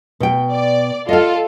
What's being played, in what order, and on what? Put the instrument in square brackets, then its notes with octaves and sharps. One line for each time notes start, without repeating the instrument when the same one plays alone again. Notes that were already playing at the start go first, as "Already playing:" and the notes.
[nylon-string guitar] B2 G5
[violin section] D5
[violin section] F4 A4 [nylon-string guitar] D#5 F5